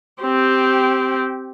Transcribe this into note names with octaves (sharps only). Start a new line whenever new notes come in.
C4 G4